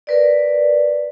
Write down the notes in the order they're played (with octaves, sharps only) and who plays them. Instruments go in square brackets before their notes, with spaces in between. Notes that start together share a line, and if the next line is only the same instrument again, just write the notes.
[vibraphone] A#4 B4 D5